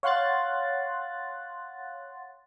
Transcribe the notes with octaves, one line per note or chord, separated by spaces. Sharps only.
C#5 F5 F#5 C6 F#6 A6